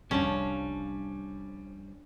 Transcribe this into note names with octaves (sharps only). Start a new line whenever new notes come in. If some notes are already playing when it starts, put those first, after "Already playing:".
F1 C2 F3 G3 C#4 D4